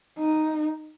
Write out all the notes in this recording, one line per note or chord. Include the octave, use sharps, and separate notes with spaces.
D#4